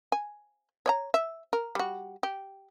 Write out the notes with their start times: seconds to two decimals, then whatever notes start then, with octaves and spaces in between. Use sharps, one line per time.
0.12 G#5
0.86 C#5 D5 A#5
1.14 E5
1.53 A#4
1.75 G3 F#4
2.23 G4